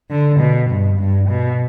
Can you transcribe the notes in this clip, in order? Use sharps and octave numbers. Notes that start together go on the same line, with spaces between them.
D3
B2
G2
G2
B2